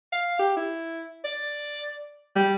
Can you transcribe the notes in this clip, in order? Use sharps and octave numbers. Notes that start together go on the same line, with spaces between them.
F5
G4
E4
D5
G3